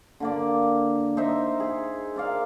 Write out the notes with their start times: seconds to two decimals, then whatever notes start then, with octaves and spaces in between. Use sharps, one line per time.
0.20 D3 A#3 D5
1.17 D#4 C5 E5
1.60 G#4
2.16 A#4 D5 F5